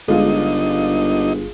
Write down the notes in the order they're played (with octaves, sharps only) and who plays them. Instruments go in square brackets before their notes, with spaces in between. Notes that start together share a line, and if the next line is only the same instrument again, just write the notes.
[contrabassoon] G1 [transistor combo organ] D3 D#4 D#5 [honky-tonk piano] G#3 F4